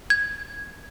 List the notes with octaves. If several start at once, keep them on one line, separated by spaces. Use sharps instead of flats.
G#6